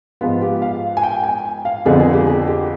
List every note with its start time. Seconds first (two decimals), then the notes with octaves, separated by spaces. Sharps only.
0.21 G#2 F3 G#3 B3 F4
0.42 G4
0.62 F5
0.97 G#5
1.03 G5
1.23 G#5
1.65 F5
1.85 F2 D3 F3 G#3 B3 G#4
2.00 G#4
2.13 G4
2.27 G#4
2.47 G4